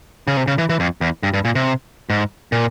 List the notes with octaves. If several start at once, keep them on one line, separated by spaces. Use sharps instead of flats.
C#3
C3
C#3
E3
E3
F2
E2
G2
G2
A#2
C3
G#2
A#2